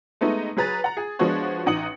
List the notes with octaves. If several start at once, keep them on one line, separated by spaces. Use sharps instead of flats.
G#3 A3 B3 D#4
F#3 G#4 B4 A#5 A6
F#5 A#5
G#4
F3 G#3 B3 D4 F#4 C#5
A1 D#4 F#5 D#6 C#7 F#7